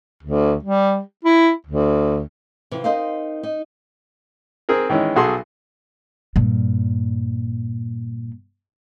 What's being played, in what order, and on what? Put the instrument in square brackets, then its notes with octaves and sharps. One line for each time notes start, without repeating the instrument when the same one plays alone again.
[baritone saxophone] D2
G3
E4
D2
[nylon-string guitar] C3 E3 F3
C4 D#4 A#4 C5 D#5 F5
D#4
[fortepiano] C4 G#4 A#4
D#3 E3 G#3 C#4
B1 F#4 G#4 A4 C6
[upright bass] G2 A#2